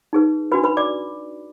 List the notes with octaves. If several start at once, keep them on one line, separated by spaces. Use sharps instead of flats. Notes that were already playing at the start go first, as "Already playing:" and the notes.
D#4 G#4 B4
D4 F#4 B4 B5
B4 B5
D5 D6